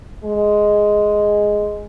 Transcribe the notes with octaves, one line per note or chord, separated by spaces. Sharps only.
G#3